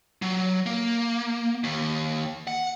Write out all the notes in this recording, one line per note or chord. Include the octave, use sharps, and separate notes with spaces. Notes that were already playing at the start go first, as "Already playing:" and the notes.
F#3
A#3
D#2
F#5